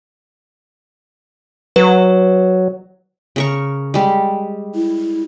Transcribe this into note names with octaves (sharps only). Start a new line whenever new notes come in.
F#3 B4
C#3 A#4 C#6
G3 G#3
E4